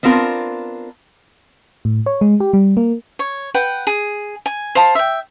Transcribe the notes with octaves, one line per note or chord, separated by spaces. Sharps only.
B3 C4 D4 F4 A#4
A2
C#5
G#3
G4
G3
A#3
C#5
B4 F#5 G5
G#4
G#5
C5 F5 A5 B5
E5 G5